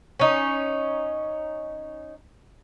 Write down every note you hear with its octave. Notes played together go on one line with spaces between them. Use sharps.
C#4 D#4